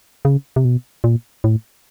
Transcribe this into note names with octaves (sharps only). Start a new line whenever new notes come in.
C#3
C3
B2
A#2
A2